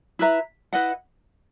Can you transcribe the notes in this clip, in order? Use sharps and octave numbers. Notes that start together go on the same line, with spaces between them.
E4 B4 E5 A#5
E4 B4 D#5 F#5